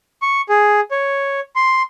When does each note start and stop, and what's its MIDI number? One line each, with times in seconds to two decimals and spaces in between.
0.22 0.41 85
0.49 0.80 68
0.91 1.40 73
1.56 1.83 84